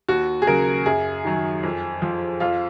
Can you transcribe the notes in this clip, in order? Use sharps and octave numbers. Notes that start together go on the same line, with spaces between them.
D#2 F#4
G#4
C#3 F#3 A#4
F#2 G#4
D#3 F#3
F2
F3
F2 F4